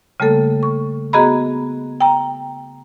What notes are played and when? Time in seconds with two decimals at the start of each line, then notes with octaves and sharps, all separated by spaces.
0.20 C#3 G3 A3 A#3 A4
0.63 C#6
1.13 B3 F#4 G#4 D#5 A#5 B5
2.01 G5 A#5